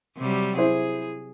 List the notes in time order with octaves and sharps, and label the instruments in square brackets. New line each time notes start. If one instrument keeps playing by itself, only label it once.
[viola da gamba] C3 F#3 G3
[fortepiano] E4 C5 [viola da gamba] G#4